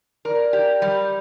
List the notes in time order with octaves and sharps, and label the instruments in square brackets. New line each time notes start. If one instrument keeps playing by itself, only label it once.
[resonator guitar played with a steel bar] A#4 [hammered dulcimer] D5
[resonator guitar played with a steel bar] G4
G3